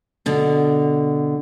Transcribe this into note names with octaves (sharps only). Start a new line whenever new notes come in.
B2 D3